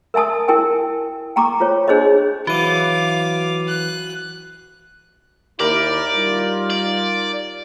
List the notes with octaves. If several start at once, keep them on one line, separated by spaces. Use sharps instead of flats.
A#4 E5 G#5 A5 D#6
E4 A#4 G5 G#5
G5 A#5 C#6 D6
F4 C5 C#5
D4 G#4 C5 C#5 D#5
E3 F#3 F#4 F5 D6 D#7
F#6
D#2 E4 G4 A#4 D5 F6
G3 D#4 F4
D5